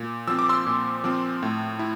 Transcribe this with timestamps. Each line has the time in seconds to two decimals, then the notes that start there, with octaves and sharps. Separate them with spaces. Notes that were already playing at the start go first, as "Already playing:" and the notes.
Already playing: A#2
0.28 F3 C4 E6
0.39 D6
0.49 C6 E6
0.66 A#2
1.04 F3 C4
1.43 A2
1.79 E4